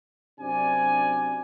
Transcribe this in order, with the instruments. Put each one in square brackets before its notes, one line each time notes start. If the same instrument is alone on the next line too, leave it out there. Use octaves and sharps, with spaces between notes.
[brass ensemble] F#2 C3 D4 D5 G#5